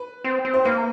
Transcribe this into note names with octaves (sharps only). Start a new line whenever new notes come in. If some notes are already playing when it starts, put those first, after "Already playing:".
Already playing: B4
C4
C4
C5
A#3 B4